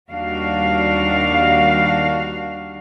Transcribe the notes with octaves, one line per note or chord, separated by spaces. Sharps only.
D#2 D#3 G3 D4 F#4 F5